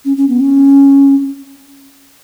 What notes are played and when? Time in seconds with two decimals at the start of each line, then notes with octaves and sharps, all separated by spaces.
0.05 C#4
0.17 C#4
0.29 B3
0.40 C#4